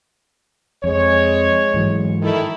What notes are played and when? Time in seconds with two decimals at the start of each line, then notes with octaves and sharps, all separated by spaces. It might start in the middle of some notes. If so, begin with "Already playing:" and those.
0.84 F2 G#3 C#5
1.74 G#2 E3 F#3
2.22 D#3 E4 A4